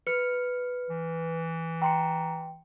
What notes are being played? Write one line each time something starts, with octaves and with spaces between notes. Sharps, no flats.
B4 F6 C#7
E3
G5 A#5 C6 C#7